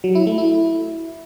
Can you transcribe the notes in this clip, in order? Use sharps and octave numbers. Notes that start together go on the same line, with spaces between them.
F#3
E4
A3
E4